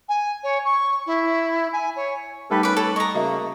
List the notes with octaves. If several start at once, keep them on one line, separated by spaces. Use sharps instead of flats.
G#5
C#5
C#6
E4
G#5
C#5
G3 A3 D#4 G4 A4 B4
C#4 B4 D6
A4 B4 C#5 B5
D#5 A#5 C#6
C#3 A#3 F#4 D#5 E5